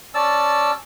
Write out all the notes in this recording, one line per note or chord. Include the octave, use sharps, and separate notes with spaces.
C#4 D5 A5 E6